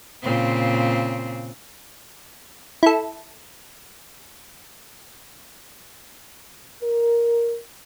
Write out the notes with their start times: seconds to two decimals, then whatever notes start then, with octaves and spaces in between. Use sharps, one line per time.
0.22 A#2 C#3 C4
2.83 E4 A4
6.82 A#4